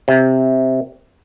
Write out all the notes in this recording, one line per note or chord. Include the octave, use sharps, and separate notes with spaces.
C3